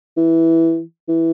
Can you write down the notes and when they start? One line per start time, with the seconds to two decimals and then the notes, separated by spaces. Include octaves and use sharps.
0.17 E3
1.08 E3